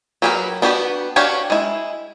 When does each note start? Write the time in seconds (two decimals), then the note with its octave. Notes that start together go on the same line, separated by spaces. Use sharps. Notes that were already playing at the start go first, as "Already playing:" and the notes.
0.22 F#3 G4 G#4 A#4 B4
0.62 B3 D4 F#4 G4 B4
1.16 D4 F#4 G4 C#5 F5
1.50 G#3 E4